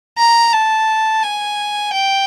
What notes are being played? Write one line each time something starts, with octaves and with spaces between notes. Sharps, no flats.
A#5
A5
G#5
G5